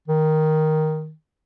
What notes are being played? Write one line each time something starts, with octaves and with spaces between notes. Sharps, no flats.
D#3